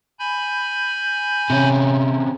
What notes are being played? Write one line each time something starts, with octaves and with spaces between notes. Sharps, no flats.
G#5 B5 G6
C3 C#4